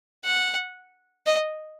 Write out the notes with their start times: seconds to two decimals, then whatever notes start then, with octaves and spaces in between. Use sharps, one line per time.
0.24 F#5
1.27 D#5